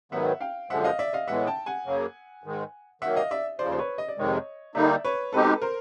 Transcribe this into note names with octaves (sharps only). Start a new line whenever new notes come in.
G#2 D#3 F#3 B3 E5 F#5
F5 G5
F#2 D3 F3 G#3 E5 F#5
D#5 F5
D5 E5
D#5 F5
A2 E3 G#3 B3 E5 F#5
G5 A5
F#5 G#5
F#2 C#3 F#3 A#3
G#2 D#3 G#3
D#3 F#3 A#3 E5 F#5
D#5 F5
D5 E5
D#2 C#3 F3 C5 D5
C5
B4 C#5
D#5
D5
F2 C3 D#3 G#3 C#5 D#5
D3 G3 A#3 D#4 D5 E5
B4 C#5
B2 G#3 C4 D#4 G4 A4 B4
A#4 C5